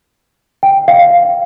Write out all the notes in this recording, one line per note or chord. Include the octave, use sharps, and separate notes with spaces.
G5
F5